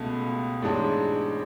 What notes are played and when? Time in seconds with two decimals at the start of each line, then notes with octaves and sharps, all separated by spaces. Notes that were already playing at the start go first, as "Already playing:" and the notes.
Already playing: C#2 B2 A3
0.62 A1 G#2 G#3 D4